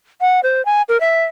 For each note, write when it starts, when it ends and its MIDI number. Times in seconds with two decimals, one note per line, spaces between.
0.21 0.40 78
0.43 0.64 72
0.65 0.82 80
0.89 0.99 70
1.00 1.24 76